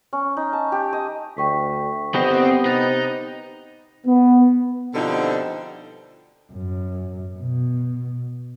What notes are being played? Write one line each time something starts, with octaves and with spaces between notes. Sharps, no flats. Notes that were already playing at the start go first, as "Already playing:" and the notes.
C#4
D#4
A5
G4
D#5
D2 G5 C#6 B6
G1 B3 C4 G4 C5 D#5
C3 D#4 C5 F#6 A6
B3
B2 D3 F3 G3 C4 D#4
F#2
B2